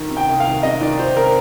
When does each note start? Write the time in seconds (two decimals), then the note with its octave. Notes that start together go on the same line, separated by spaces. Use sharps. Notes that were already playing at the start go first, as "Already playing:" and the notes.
Already playing: D#3
0.10 C3
0.17 G5
0.28 C2
0.40 F5
0.47 D#3
0.63 C3 D#5
0.81 D#3 D5
0.99 D#3 C5
1.17 C3 A#4